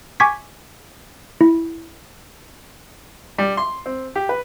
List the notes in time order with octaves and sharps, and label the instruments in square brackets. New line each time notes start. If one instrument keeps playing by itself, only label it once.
[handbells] G#5 C#6 D6 G#6 B6
E4
[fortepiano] G3
C6
C4
G4
B4